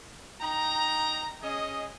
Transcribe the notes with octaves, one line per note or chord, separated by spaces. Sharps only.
D#4 G5 A#5
C#4 G#4 D#5